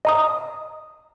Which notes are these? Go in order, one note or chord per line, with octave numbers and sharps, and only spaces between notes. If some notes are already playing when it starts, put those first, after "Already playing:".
D#5 A#5 D#6